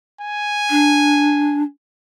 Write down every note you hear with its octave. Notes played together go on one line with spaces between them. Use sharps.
G#5
D4